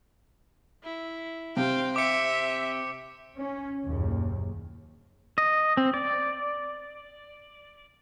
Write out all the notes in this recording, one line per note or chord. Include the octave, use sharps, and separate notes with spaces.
E4
C3 C5 F5 G5
C4 E5 G5 D6 C#7
C#4
F#1 D#2 A#2
D#5
C4
D5